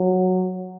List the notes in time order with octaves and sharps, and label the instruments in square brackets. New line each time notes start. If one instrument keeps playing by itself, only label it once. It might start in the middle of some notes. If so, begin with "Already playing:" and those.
Already playing: [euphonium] F#3